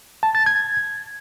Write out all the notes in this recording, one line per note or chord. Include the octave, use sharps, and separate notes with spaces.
A5
A6
G#6